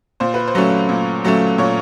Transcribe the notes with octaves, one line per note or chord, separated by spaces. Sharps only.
A#2 C5
B4
C5
F#3 A3 C#4
A#2
F#3 A3 C#4
A#2 C#5